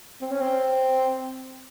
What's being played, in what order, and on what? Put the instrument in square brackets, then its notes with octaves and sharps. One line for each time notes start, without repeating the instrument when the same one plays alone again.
[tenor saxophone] C4
C#4
C4